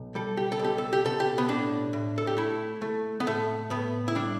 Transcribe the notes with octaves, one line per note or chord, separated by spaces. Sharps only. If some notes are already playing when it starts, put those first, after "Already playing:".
Already playing: B1
G3 A4
G4
A4
B1 G4
A4
G4
B2 A4
G4
B3
A2 D4
A2
A4
G4
A3 E4
A3
B3
A2 A3
A2 B3
E4
G3 D4